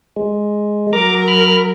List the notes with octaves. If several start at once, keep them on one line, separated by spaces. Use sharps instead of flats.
G#3
F#3 A#4 A#5 D6
B5 F6